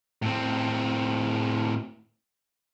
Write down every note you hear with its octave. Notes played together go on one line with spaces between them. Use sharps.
A2 C4